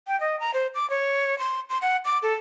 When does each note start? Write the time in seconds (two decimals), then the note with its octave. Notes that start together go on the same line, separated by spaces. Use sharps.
0.08 G5
0.21 D#5
0.40 A#5
0.54 C5
0.75 D6
0.90 C#5
1.39 C6
1.70 C6
1.82 F#5
2.05 D6
2.23 A4